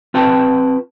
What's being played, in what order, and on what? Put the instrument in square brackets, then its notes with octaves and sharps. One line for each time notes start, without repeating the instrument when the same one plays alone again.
[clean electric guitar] C4 F4 B4 G5 A5